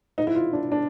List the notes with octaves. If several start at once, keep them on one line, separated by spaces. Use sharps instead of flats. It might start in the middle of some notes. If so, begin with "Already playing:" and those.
D#4
E4
F4
D4
D4